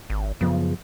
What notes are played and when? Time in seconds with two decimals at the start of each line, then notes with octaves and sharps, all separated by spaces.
0.10 G#1
0.41 F#2 C#3 F3 B3